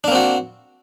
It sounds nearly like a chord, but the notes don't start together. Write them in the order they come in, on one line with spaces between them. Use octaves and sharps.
D4 A#3 C4 F#4